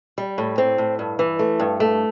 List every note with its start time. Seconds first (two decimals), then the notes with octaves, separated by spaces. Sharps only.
0.18 G3
0.38 A2
0.58 C4
0.78 A2
0.99 G2
1.19 E3
1.39 A3
1.60 G2
1.80 A3